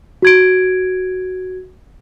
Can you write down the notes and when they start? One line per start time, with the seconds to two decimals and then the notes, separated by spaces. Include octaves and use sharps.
0.22 F#4 G#6 D7